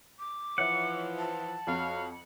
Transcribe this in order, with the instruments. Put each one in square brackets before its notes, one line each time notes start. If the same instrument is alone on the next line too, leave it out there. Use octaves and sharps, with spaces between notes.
[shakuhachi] D6
[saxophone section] E3 F3 [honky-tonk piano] C#5 E5 [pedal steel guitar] F#5
[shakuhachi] A5
[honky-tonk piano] F2 [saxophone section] F#4 C#5 F5